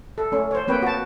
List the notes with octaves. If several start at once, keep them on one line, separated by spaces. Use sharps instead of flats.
A4
A3 C#4
C5 C#5
A#3 C4 B4 C#5 G5
F#4 A5